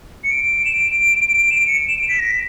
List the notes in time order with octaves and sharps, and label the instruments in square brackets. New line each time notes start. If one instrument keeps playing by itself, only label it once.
[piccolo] C#7
D7
E7
D7
E7
D7
C#7
D7
E7
D7
B6
A#6
B6